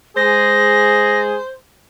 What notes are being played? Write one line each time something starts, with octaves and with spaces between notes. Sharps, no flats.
G#3 G#4 C5 A#6